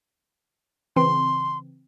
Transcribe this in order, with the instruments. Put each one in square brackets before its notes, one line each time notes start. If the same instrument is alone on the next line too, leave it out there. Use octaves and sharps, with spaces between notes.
[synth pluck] C#3 E3 C4 [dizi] C6